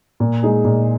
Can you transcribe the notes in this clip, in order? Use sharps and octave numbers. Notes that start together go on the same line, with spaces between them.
A#2
G#3 D#4 G#4
A#2